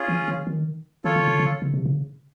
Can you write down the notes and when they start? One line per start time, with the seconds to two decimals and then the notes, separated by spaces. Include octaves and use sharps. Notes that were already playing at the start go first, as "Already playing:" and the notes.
Already playing: C#4 F4 G#4
0.08 E3
0.28 D#3
0.47 D#3
1.04 D#3 F4 A4 C#5
1.16 D3
1.28 C#3
1.39 D3
1.62 C#3
1.74 C3
1.86 C#3